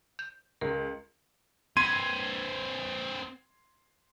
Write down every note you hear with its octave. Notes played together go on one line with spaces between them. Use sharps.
G6
C#2 A#4
C4 B4 C6 G#6 D#7